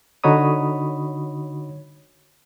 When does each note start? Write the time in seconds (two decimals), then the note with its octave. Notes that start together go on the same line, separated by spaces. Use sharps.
0.24 D3 D#4 F#4 C#5 B5 D#6